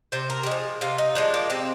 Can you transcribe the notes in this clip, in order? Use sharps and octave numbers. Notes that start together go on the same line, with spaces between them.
C3 C5
A#4
G4
F3 G#3 G#4
C3 F4
D#4
F3 G#3 D4
A#3
C3 C4